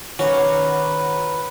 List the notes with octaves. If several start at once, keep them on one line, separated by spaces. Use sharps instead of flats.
D#3 C#4 F#4 A#4 B4 D6